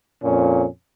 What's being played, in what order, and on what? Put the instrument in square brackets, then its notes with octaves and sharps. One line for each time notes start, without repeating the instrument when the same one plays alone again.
[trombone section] F2 A#2 C#4